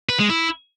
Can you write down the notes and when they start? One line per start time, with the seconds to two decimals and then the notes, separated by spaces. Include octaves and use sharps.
0.09 B4
0.19 G#3
0.30 E4